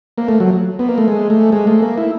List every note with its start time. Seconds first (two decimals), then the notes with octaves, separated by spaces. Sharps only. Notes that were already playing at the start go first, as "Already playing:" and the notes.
0.18 A#3
0.28 A3
0.40 F#3
0.79 B3
0.89 A#3
0.98 A3
1.08 G#3
1.30 A3
1.52 G#3
1.67 A3
1.82 A#3
1.98 E4